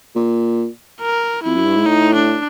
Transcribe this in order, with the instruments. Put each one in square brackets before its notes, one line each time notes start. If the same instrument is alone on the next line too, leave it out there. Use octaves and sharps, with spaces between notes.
[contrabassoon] A#2
[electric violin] A#4
[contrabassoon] F2 [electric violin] E4
[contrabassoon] F#2
G2
G#2
[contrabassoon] A2 [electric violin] D#4
[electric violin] D4